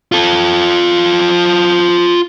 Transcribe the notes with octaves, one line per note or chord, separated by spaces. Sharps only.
F4 A4